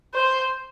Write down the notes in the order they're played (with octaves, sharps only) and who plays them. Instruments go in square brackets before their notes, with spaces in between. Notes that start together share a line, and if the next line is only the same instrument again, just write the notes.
[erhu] C5